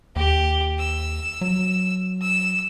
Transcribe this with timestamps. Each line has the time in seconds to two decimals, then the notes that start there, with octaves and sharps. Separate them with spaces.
0.16 D#2 G4
0.79 E6
1.41 F#3
2.22 E6